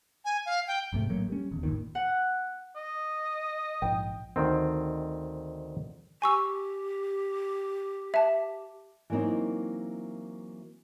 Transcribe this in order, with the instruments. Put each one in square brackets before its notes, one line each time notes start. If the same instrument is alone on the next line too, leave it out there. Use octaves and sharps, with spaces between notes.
[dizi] G#5
F5
G5
[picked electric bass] A#1 G#2 C3 A3
A1 F#3 A3 A#3
G3 C#4
D#1 E2
G#1 C#2 A#2 D#3
[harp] F#5
[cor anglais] D#5
[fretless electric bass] A#1 G#2 [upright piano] G5
[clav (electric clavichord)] D2 D#3 C4
[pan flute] G4 [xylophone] G#5 C#6 E6
[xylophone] E5 A5
[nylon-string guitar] E3 F#3 A#3 C4 D#4